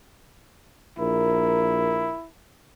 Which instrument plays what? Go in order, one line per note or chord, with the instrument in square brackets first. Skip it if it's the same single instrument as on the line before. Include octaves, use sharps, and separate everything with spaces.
[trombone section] A#1 A#4 [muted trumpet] E4